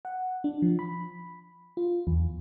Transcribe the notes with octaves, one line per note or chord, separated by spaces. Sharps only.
F#5
D4
F3
B5
F4
E2